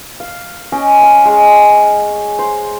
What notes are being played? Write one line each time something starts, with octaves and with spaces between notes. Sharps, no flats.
F5
C#4 D#5 G5
F5 G5
G#3
C5